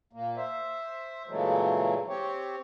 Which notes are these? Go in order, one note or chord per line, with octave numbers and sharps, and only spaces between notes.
A#2 A#3
C5 E5
A#2 C#3 E3 F#3 G#3 A3
C4 G4 C#5